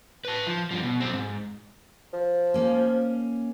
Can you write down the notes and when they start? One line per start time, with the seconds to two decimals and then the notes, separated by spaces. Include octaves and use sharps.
0.25 B4 A5
0.47 F3
0.71 G2 F3
0.83 B2
1.00 F#3 C4
1.14 G#2
2.13 F3
2.54 A#3 C#4